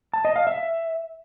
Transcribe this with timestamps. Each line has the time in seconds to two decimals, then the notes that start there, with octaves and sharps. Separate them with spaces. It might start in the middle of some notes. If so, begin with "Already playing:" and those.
0.13 A5
0.25 D#5
0.36 F5
0.47 E5